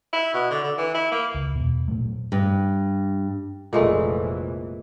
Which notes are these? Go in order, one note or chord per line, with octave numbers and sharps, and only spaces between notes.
E4
B2
D3
D3
E3
E4
A#3
C#2
E2 B2
A#2 F#3 A3
G2
F1 A#1 A#2 E3 G#3 A3